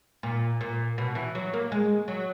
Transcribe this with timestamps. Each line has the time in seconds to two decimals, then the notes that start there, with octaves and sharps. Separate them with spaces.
0.23 A#2
0.61 A#2
0.98 B2
1.15 E3
1.35 F#3
1.53 A#3
1.72 G#3
2.08 F#3